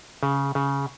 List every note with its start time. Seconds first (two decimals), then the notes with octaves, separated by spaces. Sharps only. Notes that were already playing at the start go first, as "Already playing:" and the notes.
0.23 C#3
0.55 C#3